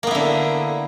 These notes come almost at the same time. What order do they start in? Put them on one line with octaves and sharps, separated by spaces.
A#3 B3 E4 D3